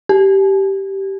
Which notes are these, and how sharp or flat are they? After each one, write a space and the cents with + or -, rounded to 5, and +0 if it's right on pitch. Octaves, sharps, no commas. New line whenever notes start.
G4 -10